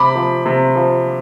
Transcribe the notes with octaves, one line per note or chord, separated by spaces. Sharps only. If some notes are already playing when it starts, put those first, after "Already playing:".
Already playing: C3 B5 D6
F3
C3
F3